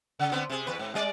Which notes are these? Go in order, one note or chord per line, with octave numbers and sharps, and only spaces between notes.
C#3
D3 B3 C4
C3 G#4
E2 B4
G#2
G3 D5